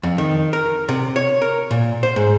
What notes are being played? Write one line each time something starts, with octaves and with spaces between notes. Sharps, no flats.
F2
D#3
A#4
C3
C#5
A#4
A#2
C5
G#2